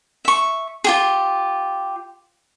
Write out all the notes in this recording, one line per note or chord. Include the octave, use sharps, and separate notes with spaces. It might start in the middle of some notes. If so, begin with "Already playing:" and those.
E5 C#6
F4 G4 G#4